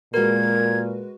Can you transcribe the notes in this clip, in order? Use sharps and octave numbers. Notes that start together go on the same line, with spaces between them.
A#2 G#3 F#4 A#4 B4 G#6